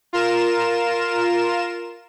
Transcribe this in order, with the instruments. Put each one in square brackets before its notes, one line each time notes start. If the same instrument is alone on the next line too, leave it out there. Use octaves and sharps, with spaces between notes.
[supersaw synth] F4 A#4 E7